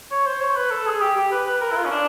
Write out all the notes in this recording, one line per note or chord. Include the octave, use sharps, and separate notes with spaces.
C#5
C5
C#5
B4
A4
G#4
G4
G4
B4
B4
A#4
E4
F4
C#4
D4